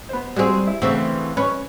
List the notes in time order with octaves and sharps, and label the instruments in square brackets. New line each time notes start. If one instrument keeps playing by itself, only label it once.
[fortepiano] B3 C5
[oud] G3 C4 [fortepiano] G#3 F#4 G#4
[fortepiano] E4
[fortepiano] D2 C#3 [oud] E3 C4
[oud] C#4 [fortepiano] B4 C#5 C#6